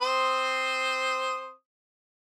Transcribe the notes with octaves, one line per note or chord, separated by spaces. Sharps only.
C4 C5 D#6